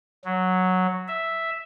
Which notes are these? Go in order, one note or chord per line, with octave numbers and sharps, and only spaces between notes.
F#3
E5